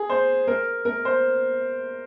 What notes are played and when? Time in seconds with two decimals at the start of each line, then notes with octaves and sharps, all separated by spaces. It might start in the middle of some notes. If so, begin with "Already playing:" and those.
Already playing: G#4
0.09 C5
0.48 A#4
0.85 A#4
1.05 C5